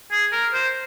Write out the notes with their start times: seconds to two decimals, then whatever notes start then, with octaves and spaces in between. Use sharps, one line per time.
0.11 G#4
0.33 A#4
0.54 C5